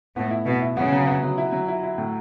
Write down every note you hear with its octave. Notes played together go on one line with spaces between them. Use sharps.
A2 B3
E4
B2 E4
E4
C#3 B3
F#3
B3
F#3
E4
F#3
E4
E4
A2